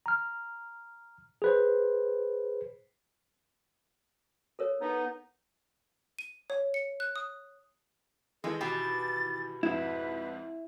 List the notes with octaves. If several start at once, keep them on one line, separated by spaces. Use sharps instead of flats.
A#5 F6
G#4 B4 C5
A4 A#4 C#5
B3 D#4
D#7
C#5
C#7
F#6
D#6
D#3 E3 G#3 A4
B2 G4 A6
F2 G#2 E4 B4